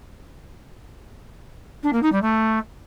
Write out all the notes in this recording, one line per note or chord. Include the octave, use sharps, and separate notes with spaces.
D4
A#3
D#4
G3
A3